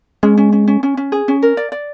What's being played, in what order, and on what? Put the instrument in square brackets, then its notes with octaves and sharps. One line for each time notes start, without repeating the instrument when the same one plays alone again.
[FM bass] G#3 [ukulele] C#4
[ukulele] C#4
C#4
C#4
C#4
C#4
G#4
C#4
A#4
D5
D5